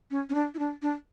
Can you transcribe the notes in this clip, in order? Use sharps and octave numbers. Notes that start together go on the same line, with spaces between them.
C#4
C#4
D4
E4
D4
D4